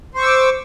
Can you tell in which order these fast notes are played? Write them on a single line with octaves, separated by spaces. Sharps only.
C5 C#6 E6 D6